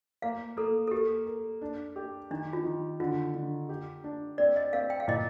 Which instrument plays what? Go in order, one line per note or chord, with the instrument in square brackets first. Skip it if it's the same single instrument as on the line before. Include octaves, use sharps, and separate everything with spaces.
[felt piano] A#3 [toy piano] F5
[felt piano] A#3 [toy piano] A4
[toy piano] A4
[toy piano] G4 [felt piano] A#4
[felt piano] A#4
D4
G4
[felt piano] D#3 [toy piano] D4
[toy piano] F4
[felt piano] D#3
[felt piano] D3 [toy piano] F4
[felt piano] D3
G4
D4
[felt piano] C4 [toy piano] D5
[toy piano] D#5
[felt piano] C4 [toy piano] F5
[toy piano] G5
F5
[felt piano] A#2 [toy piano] D#5